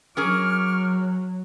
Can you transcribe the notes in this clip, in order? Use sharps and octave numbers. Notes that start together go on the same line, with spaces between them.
F#3 C#4 G#4 A#4 C#6 D6 F6